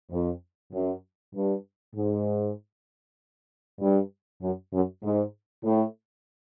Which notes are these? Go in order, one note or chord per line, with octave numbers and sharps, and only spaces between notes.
F2
F#2
G2
G#2
G2
F#2
F#2
G#2
A2